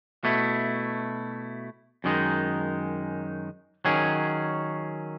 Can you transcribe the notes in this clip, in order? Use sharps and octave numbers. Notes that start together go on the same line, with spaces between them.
B2 A3 E4
F#2 D#3 G#3 D#4
D#3 F#3 C#4 G#4